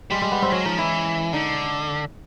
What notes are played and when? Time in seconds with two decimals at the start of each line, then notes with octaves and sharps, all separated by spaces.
0.11 G3 G#3
0.22 G#3
0.32 B3
0.42 C4
0.52 F#3 C#4
0.65 F3 D#4
0.78 E3 E4
1.33 D3 D#4